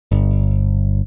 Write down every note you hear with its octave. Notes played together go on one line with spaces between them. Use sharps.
G1